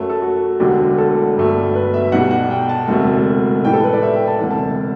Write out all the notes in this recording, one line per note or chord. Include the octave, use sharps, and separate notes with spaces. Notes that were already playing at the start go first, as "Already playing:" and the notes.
Already playing: F#2 F#3 A3
A4
F#4
E1 D2 D3 F#3 G4
A4
G1 G2 F#3 A3
B4
E5
B1 B2 G3 F#5
F#5
G5
A5
E1 D2 C3 F#3 A3
A1 A2 E3 G3 G5
A4
B4
D5
E5
G5
A5
E1 D2 C3 E3
A5